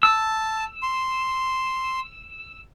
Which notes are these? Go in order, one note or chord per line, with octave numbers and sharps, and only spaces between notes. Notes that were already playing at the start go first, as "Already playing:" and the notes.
A5 E6
C6